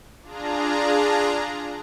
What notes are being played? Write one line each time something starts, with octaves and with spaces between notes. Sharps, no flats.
D4 F4 G#4 A#5